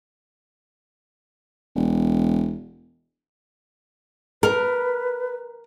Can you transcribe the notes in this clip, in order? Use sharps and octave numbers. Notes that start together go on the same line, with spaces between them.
E1
A#4 B4